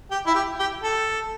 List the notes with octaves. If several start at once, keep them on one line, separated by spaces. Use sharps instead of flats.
G4
E4
G4
G4
A4